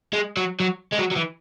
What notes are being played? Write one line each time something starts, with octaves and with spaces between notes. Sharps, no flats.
G#3
F#3
F#3
G#3
F#3
F#3
E3